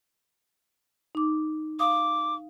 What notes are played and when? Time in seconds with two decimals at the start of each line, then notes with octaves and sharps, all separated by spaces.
1.15 D#4 D6
1.79 F5 D6 D#6